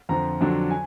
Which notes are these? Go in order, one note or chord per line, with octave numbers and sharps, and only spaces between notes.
F2 D3 F3 A#5
F2 D3 F#3 D4
G#5